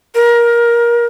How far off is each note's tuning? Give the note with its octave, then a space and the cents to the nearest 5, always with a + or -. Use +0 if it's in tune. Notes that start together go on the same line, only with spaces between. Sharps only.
A#4 +20